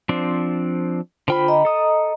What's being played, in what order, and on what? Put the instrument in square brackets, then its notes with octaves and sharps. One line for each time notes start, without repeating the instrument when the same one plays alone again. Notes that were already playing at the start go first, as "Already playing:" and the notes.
[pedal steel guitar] F3 C4 D4
[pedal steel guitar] D3 G5 B5 [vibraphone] F4 C5
[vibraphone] D#5 A#5
[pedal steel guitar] A4 D#6